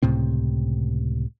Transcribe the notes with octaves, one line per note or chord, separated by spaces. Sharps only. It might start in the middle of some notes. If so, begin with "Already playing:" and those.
C#2 A2 C3 C4